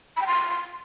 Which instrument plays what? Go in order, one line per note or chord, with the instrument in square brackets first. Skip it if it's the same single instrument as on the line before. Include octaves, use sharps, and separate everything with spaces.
[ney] B5
G5
C6